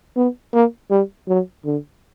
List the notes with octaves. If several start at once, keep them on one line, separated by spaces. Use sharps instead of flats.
B3
A#3
G3
F#3
D3